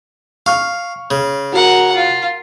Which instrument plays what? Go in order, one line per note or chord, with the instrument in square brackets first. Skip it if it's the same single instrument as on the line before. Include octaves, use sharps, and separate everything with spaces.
[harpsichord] F5 [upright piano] C#6 F6
[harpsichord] C#3
[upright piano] F#4 [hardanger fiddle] A#4 F#5
[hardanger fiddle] F4